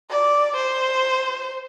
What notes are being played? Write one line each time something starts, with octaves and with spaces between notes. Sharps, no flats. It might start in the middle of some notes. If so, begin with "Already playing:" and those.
D5
C5